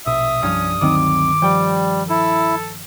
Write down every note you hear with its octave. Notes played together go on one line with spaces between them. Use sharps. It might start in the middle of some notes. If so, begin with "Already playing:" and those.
A#1 B2 E5 D#6
C2 G2 F3 C#4 F6
D2 D#3 F#3 C4 D6
F3 G3 G5
E4 A4